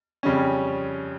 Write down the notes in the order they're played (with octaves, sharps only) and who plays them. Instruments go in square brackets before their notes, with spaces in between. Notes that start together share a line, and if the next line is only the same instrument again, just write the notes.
[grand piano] F2 C#3 G3 C#4